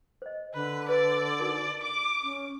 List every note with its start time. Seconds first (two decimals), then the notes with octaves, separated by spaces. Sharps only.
0.22 C5 D#5
0.54 D3 B4
0.89 B4 D5
1.40 D#4 F#4 A#4
1.82 D6
2.23 C#4